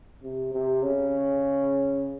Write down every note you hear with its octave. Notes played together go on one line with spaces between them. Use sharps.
C3
C3
C#3